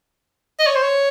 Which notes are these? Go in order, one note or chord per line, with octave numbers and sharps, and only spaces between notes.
D#5
C#5
C5
C#5